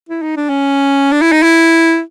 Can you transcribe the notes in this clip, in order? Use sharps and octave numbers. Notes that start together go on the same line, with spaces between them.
E4
D#4
D4
C#4
D4
E4
D#4
E4